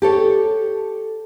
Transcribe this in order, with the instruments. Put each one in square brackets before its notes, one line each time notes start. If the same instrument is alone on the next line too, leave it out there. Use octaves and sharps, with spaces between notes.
[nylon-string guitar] G4 A4 C#5